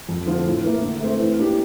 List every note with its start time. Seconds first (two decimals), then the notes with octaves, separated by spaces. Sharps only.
0.09 F2
0.26 D3 F3 C4 F4
0.46 A2
0.63 E3 A#3 E4
0.82 D3
1.00 A3 C4
1.19 E3
1.38 A#3 D4 G4